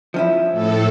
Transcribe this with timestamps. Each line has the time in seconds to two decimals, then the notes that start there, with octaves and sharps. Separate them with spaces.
0.14 F3 C#4 E4
0.52 A2 A4